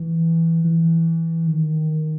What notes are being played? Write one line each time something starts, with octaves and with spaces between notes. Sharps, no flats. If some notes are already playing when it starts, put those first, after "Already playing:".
Already playing: E3
E3
D#3